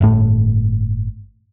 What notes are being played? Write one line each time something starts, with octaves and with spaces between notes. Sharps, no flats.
G1 A2 A3